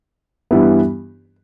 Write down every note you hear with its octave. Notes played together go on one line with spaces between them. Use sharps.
G2 E3 G3 B3 E4